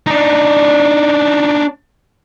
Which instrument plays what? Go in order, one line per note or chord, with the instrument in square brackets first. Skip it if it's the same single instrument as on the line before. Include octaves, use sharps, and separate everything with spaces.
[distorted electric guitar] D4 D#4